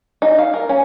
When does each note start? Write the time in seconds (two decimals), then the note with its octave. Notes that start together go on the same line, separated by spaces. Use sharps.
0.22 D#4
0.39 F5
0.54 A#4
0.69 C#4